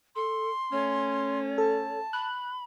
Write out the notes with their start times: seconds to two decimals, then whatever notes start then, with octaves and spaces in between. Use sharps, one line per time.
0.16 A4 C6
0.72 A3 C#4 C#5
1.58 A4 A5
2.13 B5 F#6